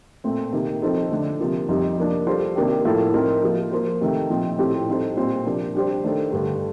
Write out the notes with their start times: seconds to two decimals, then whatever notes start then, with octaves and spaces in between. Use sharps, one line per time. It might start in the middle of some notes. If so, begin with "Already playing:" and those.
0.24 A#2 A3 C4
0.52 C3 D#3 A#3 D#4
0.82 F3 C4 D#4 A4 C5
1.11 D3 A3 D4
1.40 C3 F3 A#3
1.69 F2 C3 G3 C4 D#4
1.98 F3 A#3 D4
2.27 G3 D4 F4 A4 C5
2.56 C3 D#3 A#3 D4 G4
2.85 A2 F3 A#3 F4 A4
3.14 F3 A3 C4 D#4 A#4
3.43 F3 A#3 F4 A#4
3.72 F3 A#3 F4 C5
4.01 C3 D#3 A3
4.30 A#2 F3 C4 D#4
4.58 A2 A3 C4 G4
4.88 G3 C4 D#4 A4 C5
5.17 A#2 G3 C4 F4 C5
5.46 C3 F3 A#3 D4
5.75 G3 D4 G4 C5
6.04 D#3 A3 D4 A4 C5
6.32 G2 D3 A3